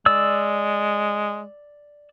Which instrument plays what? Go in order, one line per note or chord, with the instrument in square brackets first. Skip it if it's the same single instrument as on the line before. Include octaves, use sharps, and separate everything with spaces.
[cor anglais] G#3 [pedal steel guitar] D5 E6